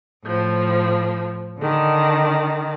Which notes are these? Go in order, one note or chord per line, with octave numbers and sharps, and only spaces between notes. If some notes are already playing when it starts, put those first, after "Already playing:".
A2 F3
D3 D#3